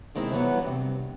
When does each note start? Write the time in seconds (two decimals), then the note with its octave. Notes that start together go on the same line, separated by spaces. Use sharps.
0.15 C3 D#3 G#3 C4 E4
0.33 E3 F#3 G3 B3 F#5
0.63 G2 C3